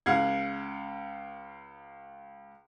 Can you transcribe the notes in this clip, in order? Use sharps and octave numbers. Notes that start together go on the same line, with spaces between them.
C#2 F5 F#5 G#6